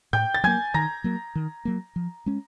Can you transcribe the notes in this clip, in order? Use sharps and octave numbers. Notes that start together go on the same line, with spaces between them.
A2 G5 G6
A6
F#3 A#3 G#5 G#6
D#3 A#5 A#6
F#3 A#3
D#3
F#3 A#3
F3
G#3 C#4